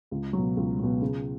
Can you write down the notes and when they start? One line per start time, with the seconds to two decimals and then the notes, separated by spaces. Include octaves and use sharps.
0.11 C#2
0.33 F#3
0.38 B2
0.57 C#2
0.79 B2 F#3
1.02 C#3